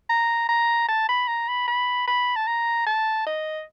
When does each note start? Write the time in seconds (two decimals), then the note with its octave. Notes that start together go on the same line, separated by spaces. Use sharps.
0.10 A#5
0.49 A#5
0.88 A5
1.09 B5
1.28 A#5
1.49 B5
1.68 B5
2.07 B5
2.36 A5
2.47 A#5
2.87 A5
3.27 D#5